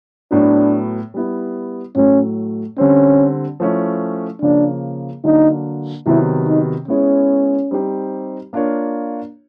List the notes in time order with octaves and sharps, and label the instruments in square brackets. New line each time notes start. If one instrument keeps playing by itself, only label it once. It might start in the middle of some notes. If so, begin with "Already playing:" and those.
[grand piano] A2 F#3 B3 [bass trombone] D4
[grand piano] G3 B3 E4
[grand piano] A2 F#3 A3 [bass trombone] C#4
[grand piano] D3 G3 C4 [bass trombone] C#4
[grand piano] F3 A3 C#4 E4
[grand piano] C#3 F3 A#3 [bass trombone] D4
[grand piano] D3 F#3 A#3 D4 [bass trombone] D#4
[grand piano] C3 D#3 F#3 B3 [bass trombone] E4
[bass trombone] D#4
[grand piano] G#3 B3 E4 G#4 C#5 [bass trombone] C#4
[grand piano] G3 C4 D#4 G4 C5
A#3 D4 F4 A#4 C#5